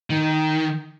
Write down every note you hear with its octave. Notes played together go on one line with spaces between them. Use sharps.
D#3